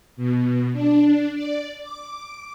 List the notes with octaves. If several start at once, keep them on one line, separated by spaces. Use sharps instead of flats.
B2
D4
D5
D6